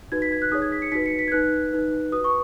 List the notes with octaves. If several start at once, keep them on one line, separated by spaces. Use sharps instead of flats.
D#4 F#4 B4 G#6
B6
G#6
F#6
D#4 G#4 C#5 D#6
G#6
B6
C#7
D#4 F#4 B4 B6
C#7
B6
G#6
D#4 B4 F#6
D#4 B4
F#4 B4 D#6
C#6